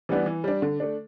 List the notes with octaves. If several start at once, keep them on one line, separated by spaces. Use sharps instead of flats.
E3 G3 B3 D4
E3
G3 D4
D3
A3 D4